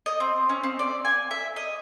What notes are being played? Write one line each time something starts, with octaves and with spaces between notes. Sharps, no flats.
D#5
C4
C#4
C4
D5
G#5
E5
D#5